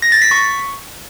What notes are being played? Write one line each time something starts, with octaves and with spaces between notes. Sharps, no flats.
A#6
A6
B6
C#6